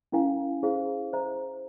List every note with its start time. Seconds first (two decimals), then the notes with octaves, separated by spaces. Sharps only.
0.12 C#4 E4 A#4 F5 G#5
0.63 E4 G#4 C5 F5
1.13 C5 E5 A#5